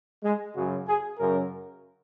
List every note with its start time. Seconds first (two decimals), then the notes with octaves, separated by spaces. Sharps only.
0.23 G#3
0.55 F#2 C#3 F#4
0.87 G#4
1.18 F#2 C#3 A#4